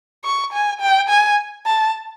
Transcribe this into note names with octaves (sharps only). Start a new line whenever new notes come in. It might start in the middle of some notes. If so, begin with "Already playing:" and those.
C#6
G#5
G5
G#5
A5